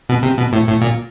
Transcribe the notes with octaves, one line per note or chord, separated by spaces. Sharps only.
B2
C3
B2
A2
A2
A#2